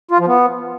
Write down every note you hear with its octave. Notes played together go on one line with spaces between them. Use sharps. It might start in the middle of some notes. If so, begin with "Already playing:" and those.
F4
F3
B3